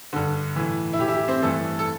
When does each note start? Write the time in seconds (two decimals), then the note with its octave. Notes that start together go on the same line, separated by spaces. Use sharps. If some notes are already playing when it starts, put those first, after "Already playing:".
0.13 G2 D3
0.56 A2 E3
0.93 E4
0.99 A2 E3 G4
1.08 E4
1.14 G4
1.28 C4 C5
1.42 G2 E3 A3 A4
1.79 A4